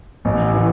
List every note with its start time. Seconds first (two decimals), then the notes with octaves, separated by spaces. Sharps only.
0.25 A1
0.54 E3